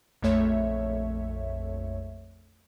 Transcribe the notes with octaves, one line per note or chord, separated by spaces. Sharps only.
A#1 F2 A3 C#5 E5